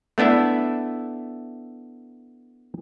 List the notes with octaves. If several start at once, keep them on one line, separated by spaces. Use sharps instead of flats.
A3 B3 D4 E4 E5